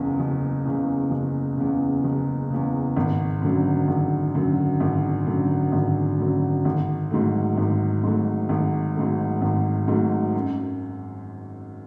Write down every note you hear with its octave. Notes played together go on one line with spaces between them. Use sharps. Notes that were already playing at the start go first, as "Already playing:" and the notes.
Already playing: F#1 E2 C#3
F#1
E2 C#3
F#1
E2 C#3
F#1
E2 C#3
G#1
F#2 D3 F#3
G#1
F#2 D3 F#3
G#1
F#2 D3 F#3
G#1
F#2 D3 F#3
G#1
G#2 F#3 A3
G#1
G#2 F#3 A3
G#1
G#2 F#3 A3
G#1
G#2 F#3 A3
F#2